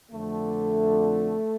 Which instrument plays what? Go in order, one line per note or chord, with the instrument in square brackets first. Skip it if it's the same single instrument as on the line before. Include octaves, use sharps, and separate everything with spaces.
[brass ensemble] F2 D3 A3